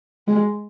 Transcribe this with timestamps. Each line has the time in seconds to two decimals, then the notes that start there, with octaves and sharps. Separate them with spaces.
0.28 G#3